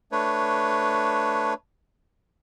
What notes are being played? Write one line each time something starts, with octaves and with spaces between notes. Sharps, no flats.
A3 D4 B4 C#5